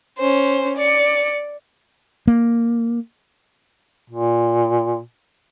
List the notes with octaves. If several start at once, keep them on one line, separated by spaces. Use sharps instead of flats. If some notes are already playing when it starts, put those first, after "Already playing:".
C#4 C5
D5 C#7
A#3
A#2